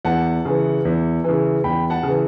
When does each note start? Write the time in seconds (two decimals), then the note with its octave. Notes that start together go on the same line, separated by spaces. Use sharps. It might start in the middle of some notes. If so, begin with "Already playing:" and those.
0.05 E2 F#5 A5
0.45 C#3 E3
0.85 E2
1.24 C#3 E3
1.64 E2 G5 B5
1.90 F#5 A5
2.03 C#3
2.08 E3